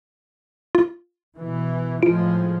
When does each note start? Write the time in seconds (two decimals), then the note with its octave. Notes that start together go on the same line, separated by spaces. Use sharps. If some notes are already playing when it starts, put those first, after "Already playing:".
0.75 F4
1.39 B2 E3
2.03 A2 F3 G#3 F4 D7